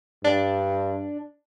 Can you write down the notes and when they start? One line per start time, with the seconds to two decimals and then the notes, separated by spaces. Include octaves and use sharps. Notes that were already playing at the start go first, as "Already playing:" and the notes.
0.24 G2 D4